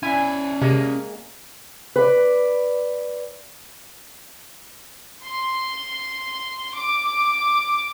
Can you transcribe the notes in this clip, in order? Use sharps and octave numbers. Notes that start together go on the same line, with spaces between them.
C#4 E4 D5 G#5
C3 G#3 A#3
B4 D5
C6
D6